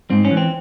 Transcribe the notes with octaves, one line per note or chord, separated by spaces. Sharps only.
G#2 C4
C#4
E3
C4